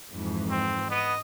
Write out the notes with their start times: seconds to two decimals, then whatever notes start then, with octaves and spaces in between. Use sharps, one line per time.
0.11 F2 G#2 E3
0.50 C4
0.90 B3 D#5